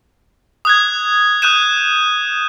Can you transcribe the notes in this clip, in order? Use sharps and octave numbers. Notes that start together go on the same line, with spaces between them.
D#6 F#6 G#6
D#6 F#6 G6 D#7 E7